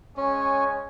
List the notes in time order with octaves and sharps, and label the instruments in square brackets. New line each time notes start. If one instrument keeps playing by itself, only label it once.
[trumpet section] G#3 C#5 G#5 [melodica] C#4